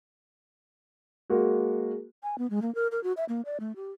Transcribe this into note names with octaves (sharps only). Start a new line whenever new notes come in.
G#3 A#3 F#4
G#5
B3
G#3
A#3
A#4
A#4
F#4
E5
A#3
D5
A3
G4